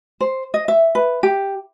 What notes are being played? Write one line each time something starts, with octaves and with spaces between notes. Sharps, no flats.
C5
D#5
E5
B4
G4